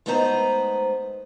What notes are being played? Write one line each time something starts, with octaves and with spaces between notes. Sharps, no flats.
G#3 A3 B3 D#4 C5 A#5